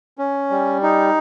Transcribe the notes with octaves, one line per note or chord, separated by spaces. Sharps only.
C#4
G3
D#4